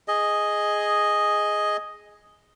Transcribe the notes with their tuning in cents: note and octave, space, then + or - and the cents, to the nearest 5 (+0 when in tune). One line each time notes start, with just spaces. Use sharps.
G#4 +0 D#5 +0